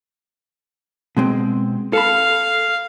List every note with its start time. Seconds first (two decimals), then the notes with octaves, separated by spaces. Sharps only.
1.17 B2 G#3 C4
1.93 A4 F5 A5 B5